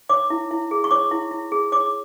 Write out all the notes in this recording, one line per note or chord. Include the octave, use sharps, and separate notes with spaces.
C#5 D6
E4
E4
G#4
C#6
C#5 D6
E4
E4
G#4
C#5 D6